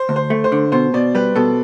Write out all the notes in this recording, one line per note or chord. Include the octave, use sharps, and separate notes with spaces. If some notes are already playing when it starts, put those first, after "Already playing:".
Already playing: C5
D2
C5
A3
C5
D3
B2 C5
B2 D5
G3 B4
B2 A4